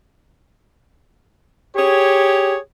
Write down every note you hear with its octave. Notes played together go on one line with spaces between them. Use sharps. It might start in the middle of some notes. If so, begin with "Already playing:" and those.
G4 G#4 C#5